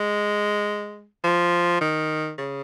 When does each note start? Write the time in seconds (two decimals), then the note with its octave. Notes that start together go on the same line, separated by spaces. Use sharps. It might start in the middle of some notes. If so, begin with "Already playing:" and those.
Already playing: G#3
1.24 F3
1.81 D#3
2.38 C#3